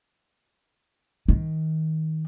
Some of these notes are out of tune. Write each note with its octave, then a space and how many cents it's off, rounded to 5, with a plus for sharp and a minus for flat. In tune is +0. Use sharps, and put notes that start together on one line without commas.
D#3 +25